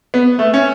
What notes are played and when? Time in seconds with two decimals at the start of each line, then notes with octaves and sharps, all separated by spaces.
0.14 B3
0.39 A3
0.53 C#4